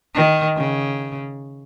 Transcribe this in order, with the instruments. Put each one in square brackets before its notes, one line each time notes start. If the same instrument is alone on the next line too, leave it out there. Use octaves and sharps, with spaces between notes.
[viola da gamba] D#3
C#3